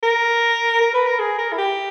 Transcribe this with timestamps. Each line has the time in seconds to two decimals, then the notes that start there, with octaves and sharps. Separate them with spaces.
0.03 A#4
0.81 A#4
0.94 B4
1.07 A#4
1.19 G#4
1.38 A#4
1.52 E4
1.58 G4